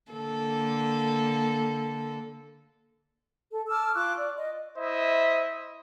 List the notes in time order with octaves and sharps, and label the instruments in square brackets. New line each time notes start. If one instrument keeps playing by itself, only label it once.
[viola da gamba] D3 A#3 A4
[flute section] A4
A5 D6 E6 F6
F4 C#6 D6 F#6
D5
D#5
[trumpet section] E4 C5 D#5 E5